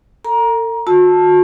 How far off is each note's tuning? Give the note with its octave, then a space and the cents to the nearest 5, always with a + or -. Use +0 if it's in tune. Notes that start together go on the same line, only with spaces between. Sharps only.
A4 +45 A#5 +20
F#4 -35 A5 +0 E6 +0